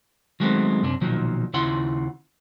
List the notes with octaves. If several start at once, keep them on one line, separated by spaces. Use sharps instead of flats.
D#3 F#3 G#3 A3 B3 C4
F#2 C3 D4
B1 A#2 D#3 F3 F#3
D#2 C#3 E4 F4 F#5 C6